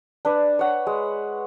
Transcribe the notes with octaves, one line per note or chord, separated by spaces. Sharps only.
D4 B4
C#5 F#5
G#3